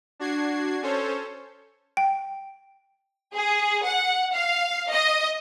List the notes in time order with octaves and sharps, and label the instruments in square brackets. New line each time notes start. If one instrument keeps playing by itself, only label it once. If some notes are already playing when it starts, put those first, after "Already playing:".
[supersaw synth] D4 F#4 G#6 C7
C#4 A4 C5 C#5
[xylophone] G5
[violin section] G#4
F#5
F5
D#5